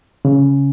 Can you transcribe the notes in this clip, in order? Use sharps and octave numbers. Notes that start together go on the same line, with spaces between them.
C#3